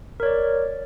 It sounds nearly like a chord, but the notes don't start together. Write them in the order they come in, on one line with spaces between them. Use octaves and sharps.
A#4 C#5 D5